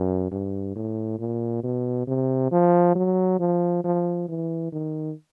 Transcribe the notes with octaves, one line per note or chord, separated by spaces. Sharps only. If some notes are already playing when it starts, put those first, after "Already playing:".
Already playing: F#2
G2
A2
A#2
B2
C3
F3
F#3
F3
F3
E3
D#3